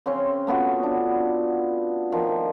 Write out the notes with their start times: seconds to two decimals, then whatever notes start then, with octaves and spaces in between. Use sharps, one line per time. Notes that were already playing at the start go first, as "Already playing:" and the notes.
0.06 C#3 C4 C#4 C6
0.47 A3 B3 F4 F#4
0.83 D4
2.12 D#3 F3